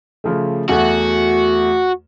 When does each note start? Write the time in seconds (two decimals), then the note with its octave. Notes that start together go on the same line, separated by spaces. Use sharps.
0.24 C#3 F3 A3
0.69 E2 A3 F#4